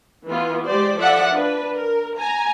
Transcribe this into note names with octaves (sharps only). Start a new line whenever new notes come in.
E3 B3 F4
G#3 G4 C5 D5
F3 A4 D5 E5 F#5
D4 B4
A#4
G#5 A#5